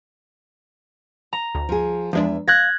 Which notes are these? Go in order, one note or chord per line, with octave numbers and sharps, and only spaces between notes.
A#5
D2
F3 G#4
E2 F3 G#3 D4 E5
F5 F#6 G#6 A#6